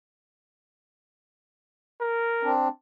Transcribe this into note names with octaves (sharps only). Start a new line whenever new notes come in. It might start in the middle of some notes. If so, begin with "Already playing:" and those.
A#4
C4 D4